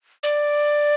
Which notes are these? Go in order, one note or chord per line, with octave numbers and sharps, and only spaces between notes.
D5